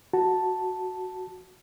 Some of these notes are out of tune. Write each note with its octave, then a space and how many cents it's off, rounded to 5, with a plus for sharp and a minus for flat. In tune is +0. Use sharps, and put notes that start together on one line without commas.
F#4 +0 A5 +0